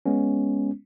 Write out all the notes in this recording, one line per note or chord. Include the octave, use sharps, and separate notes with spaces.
G#3 B3 C#4